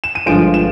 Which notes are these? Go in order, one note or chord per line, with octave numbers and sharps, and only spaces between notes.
E7
D#7
G1 G2 D3 F3 G#3 D7
E7